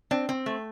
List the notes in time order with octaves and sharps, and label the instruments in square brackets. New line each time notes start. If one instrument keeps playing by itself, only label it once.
[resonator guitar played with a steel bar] C4 [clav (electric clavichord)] D4
[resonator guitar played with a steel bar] C4
A3